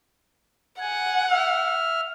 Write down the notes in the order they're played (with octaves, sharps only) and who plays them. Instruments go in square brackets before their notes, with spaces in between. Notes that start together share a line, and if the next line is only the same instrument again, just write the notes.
[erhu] F#5 [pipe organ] G#5
[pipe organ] E5 F6